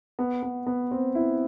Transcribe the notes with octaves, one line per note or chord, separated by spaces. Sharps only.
B3
B3
B3
C4
E4